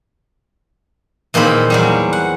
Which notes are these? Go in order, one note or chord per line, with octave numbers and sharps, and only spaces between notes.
E2 A#2 D#3 C4 B5
E2 F#3 G3
F#5